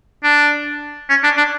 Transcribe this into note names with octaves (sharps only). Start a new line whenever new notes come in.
D4
C#4
D4
D4